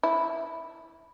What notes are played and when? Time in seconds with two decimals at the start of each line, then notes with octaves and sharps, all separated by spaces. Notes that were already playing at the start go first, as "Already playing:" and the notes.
0.03 E4